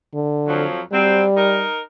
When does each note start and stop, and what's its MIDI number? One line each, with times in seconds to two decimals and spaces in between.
0.14 0.65 50
0.47 0.80 41
0.47 0.80 53
0.47 0.80 54
0.92 1.23 54
0.92 1.66 55
0.92 1.23 60
1.36 1.79 63
1.36 1.79 70